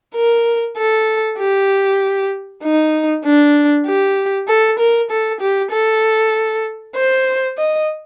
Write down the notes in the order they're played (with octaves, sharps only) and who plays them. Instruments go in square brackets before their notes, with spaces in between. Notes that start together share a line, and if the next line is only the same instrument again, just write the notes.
[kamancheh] A#4
A4
G4
D#4
D4
G4
A4
A#4
A4
G4
A4
C5
D#5